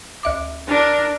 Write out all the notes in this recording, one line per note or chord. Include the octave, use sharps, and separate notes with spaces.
D2 E5 D6
D4 A#4